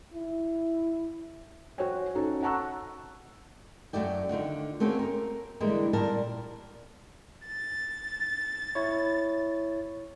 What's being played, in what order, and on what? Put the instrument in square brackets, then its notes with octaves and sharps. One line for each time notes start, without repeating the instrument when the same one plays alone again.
[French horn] E4
[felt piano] F#4 C5 C#5 G5 G#5
C#4 D#4 F#4 A4 C#5
F#5 A5 A#5 C#6 E6 F#6
[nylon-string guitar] F#2 A3 F#4 D5 G5
D3 D#3 F4 F#5
A3 A#3 C4 C#4 F#4 G#4
A#4
D3 E3 G3 G#3 A#3
A#2 G3 A#4 A5
[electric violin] A6
[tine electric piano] E4 C#5